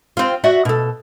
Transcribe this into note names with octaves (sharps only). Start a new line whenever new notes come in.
C4 F4
F#4 D5 E5
B2 A4